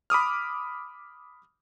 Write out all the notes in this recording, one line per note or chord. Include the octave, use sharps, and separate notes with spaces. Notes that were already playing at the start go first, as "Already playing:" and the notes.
B5 D6 D#6 F6